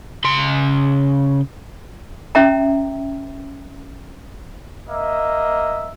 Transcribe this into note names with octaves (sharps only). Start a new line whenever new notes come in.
C#3 C6
C#4 E5 G5 A#5
A#3 D#5 E5